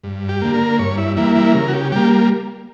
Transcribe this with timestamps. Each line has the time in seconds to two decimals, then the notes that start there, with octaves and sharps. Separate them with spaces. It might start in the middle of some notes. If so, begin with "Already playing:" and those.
0.04 G2
0.29 G4
0.42 D3 A#3
0.54 A#4
0.79 G2 C#5
0.98 E4
1.16 E3 G3 A#3 E4
1.35 E4
1.54 C#3 A#4
1.68 F#4
1.73 G4
1.92 G3 A#3 G4